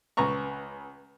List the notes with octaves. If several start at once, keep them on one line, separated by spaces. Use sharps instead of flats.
C#2 B4 A#5 C#6